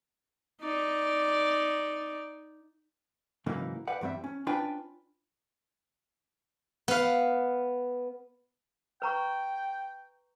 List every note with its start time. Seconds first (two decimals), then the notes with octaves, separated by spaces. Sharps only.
0.61 D#4 D5
3.46 G#2 C#3 E3 F#3 A#3 D#4
3.88 B4 C5 D5 F#5
4.01 E2 G2 G3 C4 E5
4.24 C#4
4.47 C#4 D4 F4 B4 G5 G#5
6.88 B3 F5
9.02 B4 G5 A#5 C#6